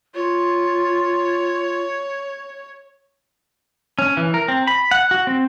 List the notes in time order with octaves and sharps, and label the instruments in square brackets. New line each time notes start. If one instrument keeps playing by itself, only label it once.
[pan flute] F4 [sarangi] C#5
[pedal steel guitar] C#4
E3
A#4
C4
B5
F#5
F#4
C4